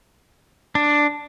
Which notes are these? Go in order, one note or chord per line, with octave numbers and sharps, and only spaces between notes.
D4